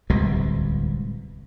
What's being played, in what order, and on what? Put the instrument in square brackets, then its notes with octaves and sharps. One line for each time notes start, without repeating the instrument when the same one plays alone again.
[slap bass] D1 C2 B2 G#3